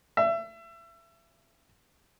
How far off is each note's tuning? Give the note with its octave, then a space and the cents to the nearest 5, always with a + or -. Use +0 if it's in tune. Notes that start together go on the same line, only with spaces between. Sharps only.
E5 +30